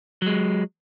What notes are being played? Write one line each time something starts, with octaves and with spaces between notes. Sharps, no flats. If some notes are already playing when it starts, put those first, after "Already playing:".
F#3 G#3